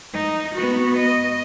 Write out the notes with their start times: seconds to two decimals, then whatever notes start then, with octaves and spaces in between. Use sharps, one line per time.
0.13 D#4
0.55 B3 F#4
0.97 D#5